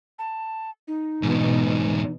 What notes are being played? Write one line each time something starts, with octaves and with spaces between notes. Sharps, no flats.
A5
D#4
E2 G#2 B2